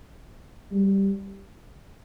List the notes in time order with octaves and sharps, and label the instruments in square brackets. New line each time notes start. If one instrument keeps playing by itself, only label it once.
[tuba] G3